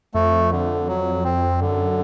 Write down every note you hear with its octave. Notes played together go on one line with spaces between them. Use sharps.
F2 A3
D3
F#3
C4
F#2 D3